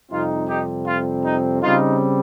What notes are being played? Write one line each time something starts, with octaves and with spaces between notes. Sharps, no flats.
F2 C3 G3 C4 D#4 F4
D#4 G4
F4
D#4
C#3 G3 C4 D#4 F4